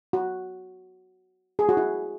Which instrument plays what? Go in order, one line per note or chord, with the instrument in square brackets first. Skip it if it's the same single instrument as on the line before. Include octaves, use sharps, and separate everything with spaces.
[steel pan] F#4
G#4
F#4
E4